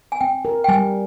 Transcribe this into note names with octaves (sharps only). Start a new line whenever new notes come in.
G#5
C4 G5
A#4
G5
G3 G#5